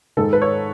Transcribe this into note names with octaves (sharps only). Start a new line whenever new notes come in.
G#2 D#3 G#3 A4
B4
C#5